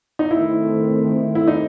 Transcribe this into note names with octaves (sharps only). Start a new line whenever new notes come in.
D#4
D#3 A3 C4 E4
E4
D#4